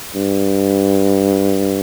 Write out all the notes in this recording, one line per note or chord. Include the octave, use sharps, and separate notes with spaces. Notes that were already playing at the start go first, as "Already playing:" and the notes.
G2